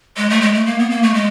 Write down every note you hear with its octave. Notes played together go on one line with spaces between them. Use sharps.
G#3
A3
G#3
A3
A#3
B3
A#3
A3
G#3